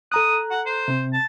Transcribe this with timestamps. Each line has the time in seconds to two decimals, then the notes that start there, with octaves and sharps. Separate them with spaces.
0.12 A4 A#5 D#6 F#6
0.51 F#5
0.66 C5
0.88 C3 C4
1.13 A5